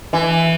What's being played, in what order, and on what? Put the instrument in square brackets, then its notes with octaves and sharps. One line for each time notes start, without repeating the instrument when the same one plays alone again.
[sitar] E3